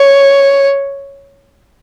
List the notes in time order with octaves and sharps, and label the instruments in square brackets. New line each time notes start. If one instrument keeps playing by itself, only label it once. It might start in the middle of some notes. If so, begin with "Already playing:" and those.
Already playing: [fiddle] C#5